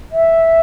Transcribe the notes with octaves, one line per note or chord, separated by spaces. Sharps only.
E5